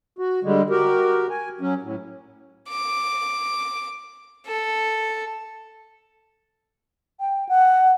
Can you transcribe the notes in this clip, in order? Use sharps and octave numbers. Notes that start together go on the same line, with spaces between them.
F#4
D3 G3 G#3
F#4 G4 A#4
G#5
F#3 C#4
A2
D6
A4
G5
F#5